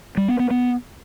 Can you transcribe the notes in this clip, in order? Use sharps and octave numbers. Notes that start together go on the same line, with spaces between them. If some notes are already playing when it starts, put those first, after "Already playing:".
G3
B3
B3
B3